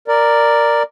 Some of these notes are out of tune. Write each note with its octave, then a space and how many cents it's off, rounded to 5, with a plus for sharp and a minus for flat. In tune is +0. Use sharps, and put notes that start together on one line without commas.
A#4 +0 D5 +5